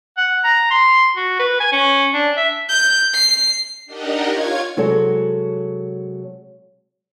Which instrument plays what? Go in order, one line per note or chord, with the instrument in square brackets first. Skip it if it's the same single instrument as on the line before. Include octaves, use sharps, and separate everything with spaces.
[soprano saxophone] F#5
A#5
C6
F#4
B4
G#5
C#4
D4
E5
[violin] G6
C7
[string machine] D4 D#4 G4 A#4 D#5 F#5
F4 C#5 F5 G#6
[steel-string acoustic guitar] C3 F#3 G#3 F#4 A4 C#5